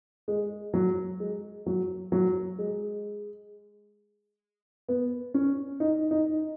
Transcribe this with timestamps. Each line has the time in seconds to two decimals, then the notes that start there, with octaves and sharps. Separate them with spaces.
0.28 G#3
0.74 F#3
1.20 G#3
1.66 F#3
2.12 F#3
2.58 G#3
4.89 B3
5.34 C#4
5.80 D#4
6.11 D#4